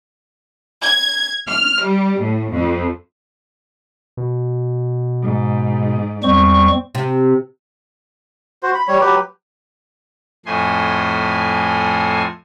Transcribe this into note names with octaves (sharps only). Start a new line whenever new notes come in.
G#6
F6
G3
A2
F2
B2
G#2
E2 G3 C4 C#6
C3
F#4 C5
B5
G3 C#5
F#3 G4 B4
F2 A2 A3 G#5 C6